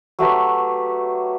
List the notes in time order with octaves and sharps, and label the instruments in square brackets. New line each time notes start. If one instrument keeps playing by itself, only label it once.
[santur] F#3 A3 G4 B4